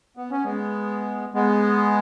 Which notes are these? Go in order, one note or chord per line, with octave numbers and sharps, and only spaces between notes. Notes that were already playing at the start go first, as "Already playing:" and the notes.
B3
C#4
G#3 B3
G#3 B3